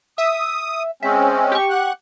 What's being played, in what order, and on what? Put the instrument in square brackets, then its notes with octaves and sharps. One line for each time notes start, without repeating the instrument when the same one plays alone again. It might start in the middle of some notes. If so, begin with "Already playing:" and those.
[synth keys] E5 [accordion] D#6
[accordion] G#3 C4 C#4 [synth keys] E5
[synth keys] G4 C#6
[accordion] F#5 F#6